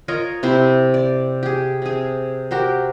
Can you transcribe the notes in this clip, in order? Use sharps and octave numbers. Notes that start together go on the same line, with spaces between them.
F4 A#4 C#5 D#5
C3 E4 C5
D5
G4 G#4
C3 G#4
F#4 G4 A#4 C5